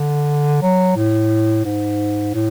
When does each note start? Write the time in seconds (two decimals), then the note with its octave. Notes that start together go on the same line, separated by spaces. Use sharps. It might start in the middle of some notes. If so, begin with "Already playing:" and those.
Already playing: D3
0.62 F#3
0.96 A2
1.65 G#2
2.34 A2